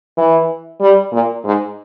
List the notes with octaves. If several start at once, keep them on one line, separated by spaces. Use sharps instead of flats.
E3
G3
A#2
G#2